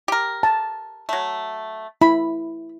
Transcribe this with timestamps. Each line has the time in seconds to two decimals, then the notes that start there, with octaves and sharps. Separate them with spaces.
0.08 G4 A#4
0.43 A5
1.09 F#3 A3
2.01 E4 B5